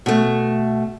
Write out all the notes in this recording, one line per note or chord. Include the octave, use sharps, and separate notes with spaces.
B2 A3